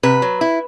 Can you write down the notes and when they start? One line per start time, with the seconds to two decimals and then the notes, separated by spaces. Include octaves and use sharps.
0.03 C3 B4
0.22 F#3
0.41 E4